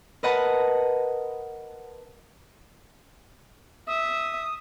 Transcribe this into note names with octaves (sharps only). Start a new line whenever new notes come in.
A#4 B4 D#5 F#5 A5 B5
E5 D#6